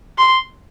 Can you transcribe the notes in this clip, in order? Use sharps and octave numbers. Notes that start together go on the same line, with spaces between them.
C6